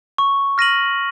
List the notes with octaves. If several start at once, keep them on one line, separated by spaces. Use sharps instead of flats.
C#6
F6 A#6 D#7 F#7